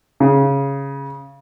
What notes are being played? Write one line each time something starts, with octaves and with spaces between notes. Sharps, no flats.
C#3